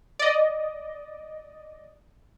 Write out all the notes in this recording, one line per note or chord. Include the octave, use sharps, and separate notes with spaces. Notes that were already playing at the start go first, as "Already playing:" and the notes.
D5 D#5